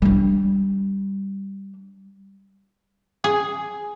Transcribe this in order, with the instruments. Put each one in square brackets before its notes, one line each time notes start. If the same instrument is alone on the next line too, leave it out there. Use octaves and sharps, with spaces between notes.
[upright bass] G3 D4
[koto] G#4